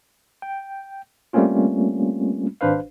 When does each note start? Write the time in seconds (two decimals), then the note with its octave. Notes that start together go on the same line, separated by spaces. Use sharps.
0.42 G5
1.33 G3 A3 A#3 C4 C#4 F4
2.61 G#1 D4 B4 C5 F5